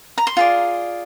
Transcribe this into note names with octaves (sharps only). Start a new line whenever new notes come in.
A#5
C6
F4 G#4 D5